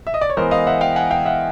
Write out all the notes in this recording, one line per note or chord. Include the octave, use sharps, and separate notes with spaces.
E5
D#5
D5
C#5
E3 G#3 B3 A#4 C5
D#5 F5
E5 F#5
F5 G5
F#5 G#5
F5 G5
E5 F#5